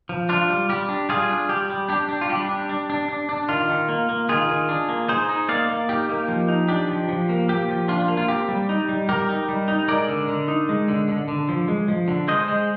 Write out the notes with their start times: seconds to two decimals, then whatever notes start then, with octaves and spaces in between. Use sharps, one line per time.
0.09 F3
0.29 D4 F4
0.50 G3
0.69 G3 G4
0.89 D4
1.09 G3 F4 G#4
1.29 D4
1.49 G3 G4
1.70 G3
1.89 D4 G4
2.09 D4
2.21 F4
2.29 G3 G4
2.49 D4
2.69 D4
2.90 D4
3.09 D4
3.29 D4
3.49 D#3 F4
3.69 D#3
3.89 A#3
4.09 A#3
4.29 D#3 F4 G#4
4.49 D#3
4.69 D4
4.89 A#3
5.08 D#4 G#4 C5
5.29 D#4
5.49 A#3 D5 F5
5.69 A#3
5.89 D#4 G4
6.09 A#3
6.28 F3
6.48 D#4
6.69 D4 G4
6.88 F3
7.09 F3
7.29 A#3
7.48 A#3 G4
7.68 F3
7.88 D4 F4
8.08 A#3
8.17 F4
8.28 C4 G4
8.49 G3
8.69 D#4
8.89 G3
9.09 G3 G4 A#4
9.29 D#4
9.49 G3
9.68 D#4
9.88 G#3 A#4 D5
10.09 D3
10.28 D3
10.48 D#4
10.69 G#3
10.88 D3
11.08 D3
11.28 D3
11.49 F3
11.68 G#3
11.88 F3
12.08 D3
12.28 G#3 C5 D#5
12.48 G#3